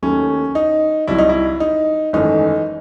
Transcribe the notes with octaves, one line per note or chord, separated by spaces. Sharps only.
D#2 D#3 F#3 A3 C#4
D#4
C2 C3 F#3 E4
D#4
E4
D#4
G#1 F#2 E3 A3 D#4